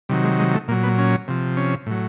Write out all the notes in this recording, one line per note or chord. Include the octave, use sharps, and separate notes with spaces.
C3 D#3 F#3 G3
G#3
G#3
A3
A#2 F#3 A#3
B3
C#4
C3 F3
C#4
A2 F#3